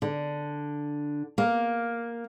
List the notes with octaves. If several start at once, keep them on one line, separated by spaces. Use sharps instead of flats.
D3
A#3